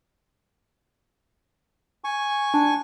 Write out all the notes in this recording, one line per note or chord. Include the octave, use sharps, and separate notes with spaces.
G#5 C#6
D4 A5